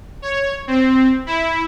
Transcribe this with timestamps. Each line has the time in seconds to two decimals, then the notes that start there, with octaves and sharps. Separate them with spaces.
0.22 C#5
0.67 C4
1.26 E4